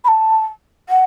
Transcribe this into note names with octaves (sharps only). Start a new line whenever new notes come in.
B5
A5
F#5